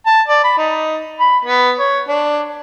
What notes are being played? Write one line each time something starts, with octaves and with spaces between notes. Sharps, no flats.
A5
D5
B5
D#4
B5
B3
C#5
D4